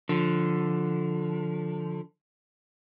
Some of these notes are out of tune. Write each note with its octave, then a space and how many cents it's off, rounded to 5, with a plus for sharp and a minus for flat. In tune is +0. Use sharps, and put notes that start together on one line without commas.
D3 +0 F3 +15